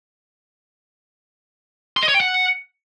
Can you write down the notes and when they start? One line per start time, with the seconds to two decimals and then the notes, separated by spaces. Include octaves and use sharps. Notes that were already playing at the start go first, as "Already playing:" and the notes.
1.97 C6
2.03 D#5
2.09 C#5
2.14 G5
2.20 F#5